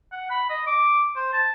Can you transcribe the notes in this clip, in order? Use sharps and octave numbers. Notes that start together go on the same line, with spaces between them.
F#5
B5
D#5
D6
C5
A5